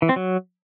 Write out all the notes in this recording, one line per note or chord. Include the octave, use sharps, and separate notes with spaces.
E3
C4
F#3